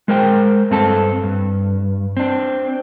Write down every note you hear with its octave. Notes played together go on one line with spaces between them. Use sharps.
G#3 A#4 C5 G5
G2 C4 A4 A5
G2
C4 D4